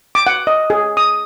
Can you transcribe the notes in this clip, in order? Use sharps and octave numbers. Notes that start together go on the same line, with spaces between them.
D6
F#5
D#5
G#4
D#6